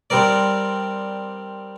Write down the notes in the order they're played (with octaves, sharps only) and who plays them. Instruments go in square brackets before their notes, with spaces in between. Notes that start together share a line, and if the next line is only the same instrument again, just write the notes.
[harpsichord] G3 C4 A#4 D5